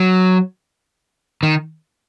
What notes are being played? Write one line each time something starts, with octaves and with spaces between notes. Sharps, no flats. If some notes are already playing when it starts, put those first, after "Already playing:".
Already playing: F#3
D#3